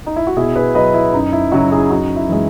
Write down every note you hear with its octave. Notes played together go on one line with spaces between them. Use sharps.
D#4
E4
F#4
B2 E4 G#4
G#4 B4
F#3 B4 D#5
E4
F#2 D#4
E4
C#3 F#3 D#4 F#4
E4 G#4
F#2 D#4 F#4
E4
E3 G#3